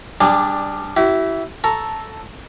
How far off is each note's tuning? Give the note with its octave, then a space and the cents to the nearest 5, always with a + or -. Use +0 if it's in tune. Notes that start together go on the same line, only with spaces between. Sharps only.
G3 +10 D4 +5 G#4 -25
E4 +0 G4 -45
A4 +0 A#5 +0 C#6 +10